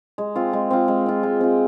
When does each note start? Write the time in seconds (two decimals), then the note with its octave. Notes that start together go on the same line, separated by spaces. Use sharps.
0.18 G#3
0.36 C4 F4
0.53 G#3
0.71 C4 F4
0.88 G#3
1.06 C4 F4
1.23 G#3
1.41 C4 F4